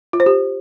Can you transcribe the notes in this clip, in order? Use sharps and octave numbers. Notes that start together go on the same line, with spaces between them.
F4
C5
G4